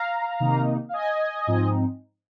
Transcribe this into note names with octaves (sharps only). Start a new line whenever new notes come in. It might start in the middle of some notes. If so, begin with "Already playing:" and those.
Already playing: F5 A#5
C3 D#3 A#3 D#4
F5
D#5 G#5
G#2 F3 C4 D#4